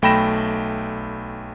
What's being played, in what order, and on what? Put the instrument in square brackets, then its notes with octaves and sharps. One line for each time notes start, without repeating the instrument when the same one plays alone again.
[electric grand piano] B1 A3 G5 B5 A#6 E7